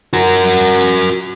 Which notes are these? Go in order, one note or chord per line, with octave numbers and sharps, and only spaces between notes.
F#4 A#4